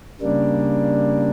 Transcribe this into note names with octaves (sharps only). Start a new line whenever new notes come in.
C#3 G3 A#3 D4